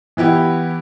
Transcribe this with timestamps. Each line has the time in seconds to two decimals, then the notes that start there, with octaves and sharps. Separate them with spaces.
0.17 E3 B3 E4 G4